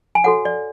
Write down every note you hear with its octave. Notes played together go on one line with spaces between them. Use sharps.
G#5
F#4 A4 C#5 F#5
D5